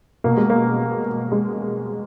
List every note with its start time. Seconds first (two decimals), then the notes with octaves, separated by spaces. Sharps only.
0.24 B2 A#3
0.37 G#3
0.50 A#3
1.32 G#3